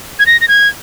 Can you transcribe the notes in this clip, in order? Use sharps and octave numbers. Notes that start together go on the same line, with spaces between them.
G#6
A#6
A#6
G#6